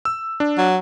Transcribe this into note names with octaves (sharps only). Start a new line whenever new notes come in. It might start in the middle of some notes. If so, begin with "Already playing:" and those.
E6
D4
F#3